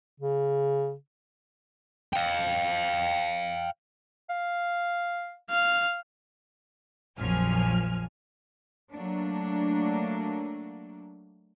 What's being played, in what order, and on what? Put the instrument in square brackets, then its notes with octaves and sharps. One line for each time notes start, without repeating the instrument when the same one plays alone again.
[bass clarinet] C#3
[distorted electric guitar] F5 G5
[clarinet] F5
[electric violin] F5
[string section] A#1 F2 F3 F#3 G#5 F6
[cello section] F#3 A3 A#3 D4